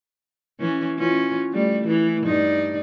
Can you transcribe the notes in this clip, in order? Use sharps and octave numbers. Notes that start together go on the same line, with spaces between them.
E3 C#4
E3 C#4 F4
G3 A3
E3
G2 D#4 D5